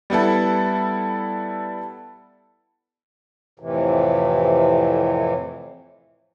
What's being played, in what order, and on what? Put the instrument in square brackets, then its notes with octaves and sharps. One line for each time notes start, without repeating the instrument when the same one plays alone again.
[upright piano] G3 B3 E4 A4
[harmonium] F2 A2 C3 E3